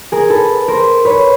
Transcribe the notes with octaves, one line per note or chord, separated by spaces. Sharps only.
G#4 A#4
A4 B4
A#4 C5
B4 C#5